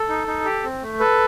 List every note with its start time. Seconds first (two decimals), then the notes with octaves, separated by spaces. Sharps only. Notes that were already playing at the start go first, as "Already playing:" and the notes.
Already playing: A4
0.09 D#4
0.27 D#4
0.45 G4
0.63 C4
0.82 A3
1.00 A4 B4